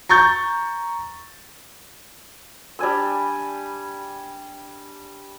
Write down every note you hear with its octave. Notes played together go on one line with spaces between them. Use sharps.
A#5 C#6 G6 A6
G3 D4 G#5 E6